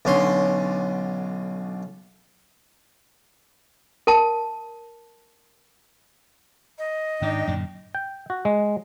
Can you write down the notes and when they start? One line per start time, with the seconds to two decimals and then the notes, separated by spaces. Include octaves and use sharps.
0.05 B1 D3 C#4 C6
4.07 A#4 A5
6.78 D#5
7.22 G#2 D#3 D4 D#4 G5
7.47 F#2 A#2 D3
7.95 G5
8.30 F#4
8.45 G#3